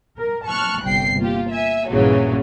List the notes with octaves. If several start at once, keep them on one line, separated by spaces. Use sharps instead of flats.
A#4
A5 C#6 F6 F#6
G1 C2 G5 C7
A#3 F4 G4
E5 G#5
A#1 G2 A#2 C#3 E3 F#3